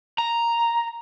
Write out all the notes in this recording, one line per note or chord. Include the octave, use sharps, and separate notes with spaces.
A#5